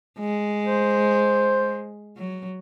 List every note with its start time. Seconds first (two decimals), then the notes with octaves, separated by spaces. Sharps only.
0.19 G#3
0.65 C5
2.17 F#3